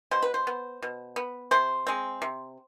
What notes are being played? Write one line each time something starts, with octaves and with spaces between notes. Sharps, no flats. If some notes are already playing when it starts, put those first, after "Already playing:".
B2 C5
B4
C5
B3
B2
B3
C3 C5
G#3 C4
C3